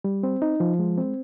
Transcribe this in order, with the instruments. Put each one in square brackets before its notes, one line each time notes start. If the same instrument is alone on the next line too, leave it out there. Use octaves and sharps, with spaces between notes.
[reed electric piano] G3
C4
D#4
F3
G#3
C4